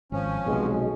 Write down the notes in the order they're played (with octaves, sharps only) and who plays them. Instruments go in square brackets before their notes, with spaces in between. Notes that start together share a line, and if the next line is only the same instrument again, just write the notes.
[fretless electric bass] G#1 [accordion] F3 C#4
[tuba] B1 [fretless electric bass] C3 F#3 [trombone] G#3